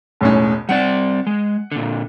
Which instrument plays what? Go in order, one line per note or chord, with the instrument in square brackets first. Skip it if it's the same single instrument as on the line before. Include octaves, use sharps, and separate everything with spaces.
[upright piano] E1 A2 C#4
[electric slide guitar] G3 C4 D5 [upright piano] F#5
[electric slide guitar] G#3
A#2 D3